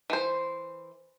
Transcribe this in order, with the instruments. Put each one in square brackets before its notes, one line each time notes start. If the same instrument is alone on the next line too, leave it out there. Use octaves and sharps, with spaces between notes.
[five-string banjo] E3 C5